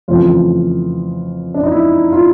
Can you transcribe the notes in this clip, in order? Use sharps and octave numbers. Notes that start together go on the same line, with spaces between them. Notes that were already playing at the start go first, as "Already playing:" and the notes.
F2 C#3 E3 A3 F4
D4
D#4
E4
F4